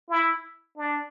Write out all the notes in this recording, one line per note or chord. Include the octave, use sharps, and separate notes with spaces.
E4
D4